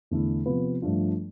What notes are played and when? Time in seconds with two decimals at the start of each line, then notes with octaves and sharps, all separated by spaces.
0.11 E2 D3 A3 E4
0.46 C3 F3 B3 F4 B4
0.82 G2 F3 A3 D4 F4